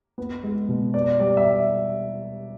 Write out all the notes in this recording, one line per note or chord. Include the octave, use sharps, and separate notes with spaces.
B3
G#3
B2
B3 D5
G3 D5
E5